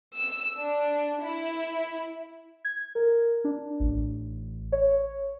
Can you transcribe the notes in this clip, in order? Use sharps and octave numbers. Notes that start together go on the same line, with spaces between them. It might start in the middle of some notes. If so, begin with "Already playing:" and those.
E6
D4
E4
G#6
A#4
D4
A1
C#5